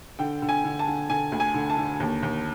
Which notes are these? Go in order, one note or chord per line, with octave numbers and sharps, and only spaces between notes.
D3 G5
D3
G#5
D3
A5
D3
D3 G#5
D2
G#5
D3
A5
D3
D#2
D#2